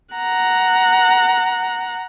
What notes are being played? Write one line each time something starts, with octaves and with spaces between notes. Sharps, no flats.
F#5 A#5